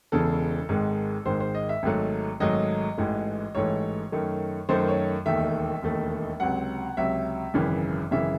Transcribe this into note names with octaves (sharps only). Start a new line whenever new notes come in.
E1 E2 C#3 A4
G#1 G#2 D#3 G#3
G#1 G#2 D#3 G#3 C5
C5
D#5
E5
G#1 G#2 F#3 A3
G#1 G#2 F#3 A3 D#5
A1 G#2 E3 A3
A1 G#2 E3 A3 C#5
F#2 D#3 A3
F#2 D#3 A3 C5
C#5
E1 D#2 D#3 A3 E5
E1 D#2 D#3 A3
C#2 C3 F#3 F#5
C#2 C3 F#3 E5
G#1 F#2 C#3 E3
G#1 F#2 C#3 E3 E5